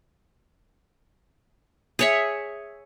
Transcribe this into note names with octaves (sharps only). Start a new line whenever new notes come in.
G#4 C#5 E5